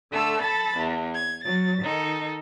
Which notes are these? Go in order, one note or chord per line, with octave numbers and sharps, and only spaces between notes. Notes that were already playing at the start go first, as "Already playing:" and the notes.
D3 A3 A4 E6
A4 A5 B5 A6
E2
G#6
F#3 A6
D#3 D#4 A4